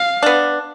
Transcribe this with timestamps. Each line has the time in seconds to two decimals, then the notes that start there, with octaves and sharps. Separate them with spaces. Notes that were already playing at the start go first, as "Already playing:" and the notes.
Already playing: F5
0.23 B3 D4